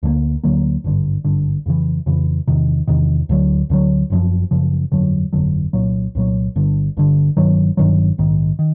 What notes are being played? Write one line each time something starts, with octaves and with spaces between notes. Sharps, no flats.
D2 D3 F#3 A#3
D2 D3 F#3 A#3
G#1 G2 D3
G#1 G2 D3
F2 C#3 E3
F2 C#3 E3
E2 C3 D#3
E2 C3 D#3
D2 D3 F#3
D2 D3 F#3
F#1 F#2 C#3 F3
F#1 F#2 C#3 F3
G1 F2 D3 F#3
G1 F2 D3 F#3
C2 A#2 F#3
C2 A#2 F#3
G1 G2 D3
G1 G2 D3
G1 G2 D#3 F#3
G1 G2 D#3 F#3
A#1 G#2 D#3
D#3